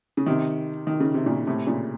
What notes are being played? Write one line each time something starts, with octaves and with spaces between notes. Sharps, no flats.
C#3
C3 D#3
D#3
C#3
C3
A#2 C#3
A2 C3
A#2 C#3